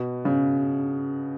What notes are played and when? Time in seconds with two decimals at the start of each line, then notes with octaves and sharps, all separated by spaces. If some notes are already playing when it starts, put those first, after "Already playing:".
Already playing: B2
0.25 C#3